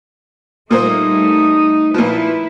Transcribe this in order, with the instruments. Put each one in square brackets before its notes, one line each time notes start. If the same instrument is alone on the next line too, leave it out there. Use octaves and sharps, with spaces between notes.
[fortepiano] A#2 A#3 C5 [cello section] G3 A3 D#4 [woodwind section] D#6
[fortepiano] A#2 F3 [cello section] E4 B4